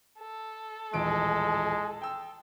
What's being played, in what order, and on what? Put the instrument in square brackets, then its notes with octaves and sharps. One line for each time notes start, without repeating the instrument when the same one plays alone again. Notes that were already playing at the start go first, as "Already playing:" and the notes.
[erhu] A4
[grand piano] D#1 A1 D7 [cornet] G#3
[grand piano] G5 E6